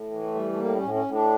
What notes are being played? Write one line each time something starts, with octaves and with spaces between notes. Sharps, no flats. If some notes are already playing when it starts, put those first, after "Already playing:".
Already playing: A2
E3
A3
G3
A3
A2 A#3
C#4
A2
C#4
A2
D4